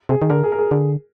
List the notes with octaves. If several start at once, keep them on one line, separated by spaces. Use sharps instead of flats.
C3 G#4
D#3
D3 A#4
G#4
A#4
G#4
D3